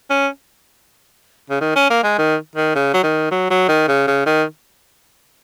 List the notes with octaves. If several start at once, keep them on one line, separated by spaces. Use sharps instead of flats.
C#4
C#3
D#3
C#4
A#3
G#3
D#3
D#3
C#3
F#3
D#3
F#3
F#3
D#3
C#3
C#3
D#3